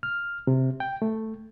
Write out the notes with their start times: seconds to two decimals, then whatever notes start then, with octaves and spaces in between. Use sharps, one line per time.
0.03 F6
0.47 C3
0.80 G5
1.02 A3